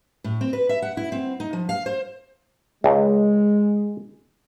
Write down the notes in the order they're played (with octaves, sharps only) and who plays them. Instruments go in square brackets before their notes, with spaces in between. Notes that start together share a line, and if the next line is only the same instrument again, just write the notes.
[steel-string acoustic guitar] A2
C4
B4
E5
F#5
E4
C4
D#4
F3
F5
C5
[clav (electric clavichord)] C#2 [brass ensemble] G#3